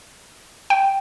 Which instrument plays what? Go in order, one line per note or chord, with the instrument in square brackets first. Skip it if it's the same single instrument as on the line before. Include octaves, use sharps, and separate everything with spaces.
[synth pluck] G5